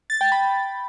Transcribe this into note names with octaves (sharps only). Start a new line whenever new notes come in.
A6
G5
B5